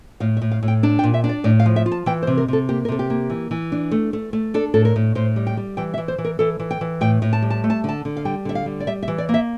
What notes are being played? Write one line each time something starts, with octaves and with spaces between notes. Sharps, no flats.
A2 F5
E5
A2
F5
A2
G5
D4 A5
G5
A#2
E5
D4
D5
A2 D5
F5
F3
E5
F4
A5
E3 G5
C5
C3
A#4
C3 A4
A#3 G4
A#4
C3 A4
G4
A#3
E3
E3
D4
A3
A3
A3
D4 A4
A2 A4
A#4
A2
A2 C5
G3
G5
G3
E3 G5
E5
E3
C5
E3
A#4
E3 A4
E3
G5
E3
A2 G5
A2
A5
G3
A5
A3
A5
D3 A5
D3
F5
G3 G5
D3 E5
F5
G3
D5
G3 E5
E5
E3
D5
A#3
E5